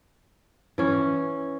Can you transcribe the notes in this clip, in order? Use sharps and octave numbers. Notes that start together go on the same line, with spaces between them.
E3 C#4